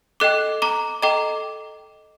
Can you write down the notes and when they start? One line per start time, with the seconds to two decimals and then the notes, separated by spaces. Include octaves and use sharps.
0.20 A4 D#5 G5 D6 F#6
0.62 A#5 D6
1.02 A4 D#5 G5 A#5 D6